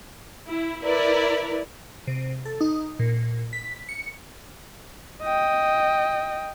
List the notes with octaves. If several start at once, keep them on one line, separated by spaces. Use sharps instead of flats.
E4
E4 A#4 B4 D5
C3
A4
D#4
A#2
B6
C#7
D#5 G5